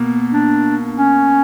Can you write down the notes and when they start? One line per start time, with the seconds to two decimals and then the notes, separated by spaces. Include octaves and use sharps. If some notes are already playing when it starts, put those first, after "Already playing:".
Already playing: B2 A#3
0.33 D4
0.96 C#4